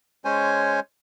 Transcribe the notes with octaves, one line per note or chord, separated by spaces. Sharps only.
G#3 C#4 C5 C#5 G#5